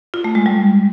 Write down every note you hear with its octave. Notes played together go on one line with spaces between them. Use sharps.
F4
A3
G#3
G3